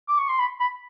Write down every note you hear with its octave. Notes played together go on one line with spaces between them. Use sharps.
D6
C#6
C6
B5
B5